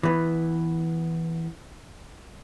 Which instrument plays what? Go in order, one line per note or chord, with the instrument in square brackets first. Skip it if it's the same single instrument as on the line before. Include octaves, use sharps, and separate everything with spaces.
[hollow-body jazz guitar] E3 B3